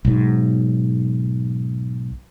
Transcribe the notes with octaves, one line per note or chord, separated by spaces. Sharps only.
B1 G#2